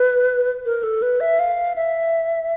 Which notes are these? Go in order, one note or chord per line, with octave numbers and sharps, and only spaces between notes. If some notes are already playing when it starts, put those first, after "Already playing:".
Already playing: B4
A#4
A4
B4
E5
F5
E5